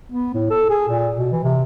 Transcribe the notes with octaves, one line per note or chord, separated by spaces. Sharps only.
B3
A2
A4
G#4
A#2
B2
E3
C3